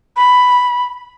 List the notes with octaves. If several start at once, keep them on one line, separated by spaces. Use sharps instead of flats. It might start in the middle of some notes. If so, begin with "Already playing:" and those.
B5